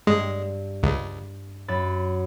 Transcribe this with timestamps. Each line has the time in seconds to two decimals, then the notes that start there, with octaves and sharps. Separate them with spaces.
0.07 G2 G#3
0.83 C#2
1.68 F#2 B5 A6